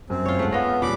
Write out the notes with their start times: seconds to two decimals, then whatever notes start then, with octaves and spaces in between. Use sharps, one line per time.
0.10 F#2 C4
0.26 F4 C#5
0.39 C#2 G#2 A3 F#5
0.52 B3 C#4 F4 F5 A#6
0.82 E2 A#2 G3 B5 D6